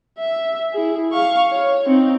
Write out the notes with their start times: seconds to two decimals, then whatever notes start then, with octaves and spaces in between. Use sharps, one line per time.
0.19 E5
0.73 E4 G#4
1.13 F5 C#6
1.51 C#5
1.86 C4 D#4